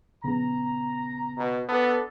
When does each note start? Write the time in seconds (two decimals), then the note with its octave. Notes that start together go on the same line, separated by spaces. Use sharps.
0.24 A#1 C#3 B3 A#5
1.38 B2
1.69 B3 D4 A4